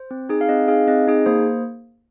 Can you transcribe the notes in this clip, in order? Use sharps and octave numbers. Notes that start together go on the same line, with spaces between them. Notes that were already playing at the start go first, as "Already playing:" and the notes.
Already playing: C5
C4
D#4 G#4
F5
C4 D#5
D#4 G#4 F5
C4 D#5
D#4 G#4
A#3 C5